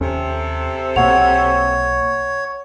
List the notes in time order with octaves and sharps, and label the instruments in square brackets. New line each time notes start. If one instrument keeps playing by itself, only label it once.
[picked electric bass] D#2 C#4 [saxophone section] C3 A4
[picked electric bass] B1 B2 A#3 [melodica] C#5 [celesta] F#5 F7